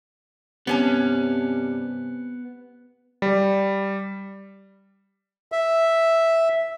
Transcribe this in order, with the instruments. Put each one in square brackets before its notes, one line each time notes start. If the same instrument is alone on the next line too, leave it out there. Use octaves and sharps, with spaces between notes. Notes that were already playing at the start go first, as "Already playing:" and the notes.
[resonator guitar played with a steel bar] G2 C#4 A5 [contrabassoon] C3 [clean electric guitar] B3
[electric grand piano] G3
[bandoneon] E5